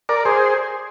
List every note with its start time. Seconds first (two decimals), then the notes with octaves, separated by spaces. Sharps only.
0.09 A#4 D5
0.25 G#4 C5